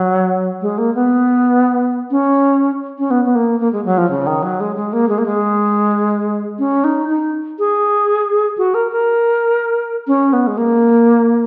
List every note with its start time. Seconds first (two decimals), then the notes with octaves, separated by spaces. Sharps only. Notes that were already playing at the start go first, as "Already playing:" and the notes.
Already playing: F#3
0.62 G#3
0.78 A#3
0.95 B3
2.11 C#4
2.99 C#4
3.11 B3
3.25 B3
3.35 A#3
3.60 A#3
3.73 G#3
3.85 F#3
3.98 F3
4.11 C#3
4.27 D#3
4.43 F#3
4.60 G#3
4.76 G#3
4.93 A#3
5.09 G#3
5.18 A#3
5.26 G#3
6.59 C#4
6.84 D#4
7.09 D#4
7.59 G#4
8.58 F#4
8.74 A#4
8.91 A#4
10.07 C#4
10.33 B3
10.47 G#3
10.58 A#3